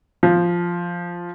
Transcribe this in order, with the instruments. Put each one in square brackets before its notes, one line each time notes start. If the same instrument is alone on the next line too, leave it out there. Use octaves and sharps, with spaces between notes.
[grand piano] F3